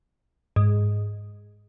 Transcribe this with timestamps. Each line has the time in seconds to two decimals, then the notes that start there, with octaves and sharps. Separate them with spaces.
0.56 G#2